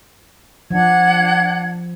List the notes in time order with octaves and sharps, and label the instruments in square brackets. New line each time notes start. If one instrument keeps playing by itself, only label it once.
[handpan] F3 [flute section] D4 F#5 G#6